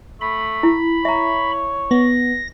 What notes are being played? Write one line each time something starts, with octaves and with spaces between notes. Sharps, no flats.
A3 B5
E4
C#5 E5 A#5
B3 A#6